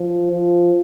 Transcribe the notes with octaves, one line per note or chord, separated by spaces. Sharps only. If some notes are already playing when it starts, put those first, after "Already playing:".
Already playing: F3
F3